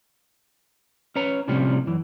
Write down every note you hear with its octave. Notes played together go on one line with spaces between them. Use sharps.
C#4 B4 C#5 A#5
C2 A2 C3 F3 G3 C#4
F#2 E3